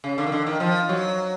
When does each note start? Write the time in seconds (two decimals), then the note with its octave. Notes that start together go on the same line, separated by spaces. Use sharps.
0.04 C#3
0.18 D3
0.26 D#3
0.32 D3
0.47 D#3
0.60 F3
0.89 F#3